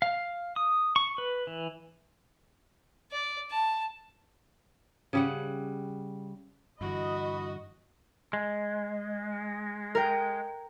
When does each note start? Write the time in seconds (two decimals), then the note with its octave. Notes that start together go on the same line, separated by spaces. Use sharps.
0.02 F5
0.56 D#6
0.96 C#6
1.18 B4
1.47 E3
3.12 D5
3.51 A5
5.13 C#3 G3 F#5
6.81 G2 D3 E3 F#4 D#5 B5
8.33 G#3
9.95 A#4 G5